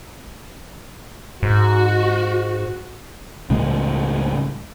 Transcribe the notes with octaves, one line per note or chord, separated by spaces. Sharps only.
G#2 F#4
C#2 A2 C#3 G#3